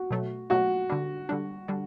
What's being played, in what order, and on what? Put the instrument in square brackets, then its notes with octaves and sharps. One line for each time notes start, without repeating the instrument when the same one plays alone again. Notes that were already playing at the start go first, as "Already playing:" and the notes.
Already playing: [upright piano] F#4
[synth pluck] B2 F#3 A3
[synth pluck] B2 F#3 A3 [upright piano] F#4
[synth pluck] D3 G3 D4
D3 G3 D4
D3 G3 D4